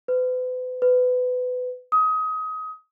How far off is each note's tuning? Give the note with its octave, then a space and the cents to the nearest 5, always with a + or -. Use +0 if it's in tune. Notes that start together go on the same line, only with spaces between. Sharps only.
B4 +40
B4 +25
D#6 +25